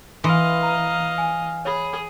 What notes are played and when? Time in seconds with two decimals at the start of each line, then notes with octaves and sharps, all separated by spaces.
0.24 E3 D#5 F5 C6
0.63 A#5
1.18 G#5
1.65 G#4 C#5 B5